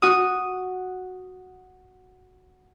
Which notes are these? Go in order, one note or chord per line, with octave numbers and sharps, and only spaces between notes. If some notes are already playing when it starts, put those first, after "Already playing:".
F#4 D#6